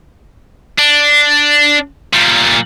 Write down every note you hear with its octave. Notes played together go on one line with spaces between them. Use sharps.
D4
A#2 G3